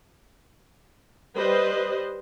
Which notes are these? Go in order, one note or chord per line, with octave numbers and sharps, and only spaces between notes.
G3 B4 C5 D#5